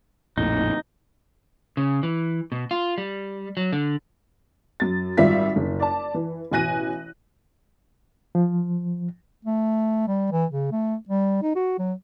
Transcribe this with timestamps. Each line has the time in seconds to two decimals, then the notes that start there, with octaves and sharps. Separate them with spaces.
0.38 A#1 F2 A2 D#4
1.77 C#3
2.03 E3
2.52 B2
2.71 F4
2.98 G3
3.57 F#3
3.72 D3
4.80 F#2 A6
5.17 G#1 G3 F4 E5 B6
5.56 F#1
5.80 D5 A5
6.14 E3
6.51 A1 B2 G#5 F#6 A#6 D#7
8.35 F3
9.45 A3
10.08 G3
10.32 E3
10.51 C#3
10.72 A3
11.09 G3
11.43 D#4
11.56 F#4
11.79 F#3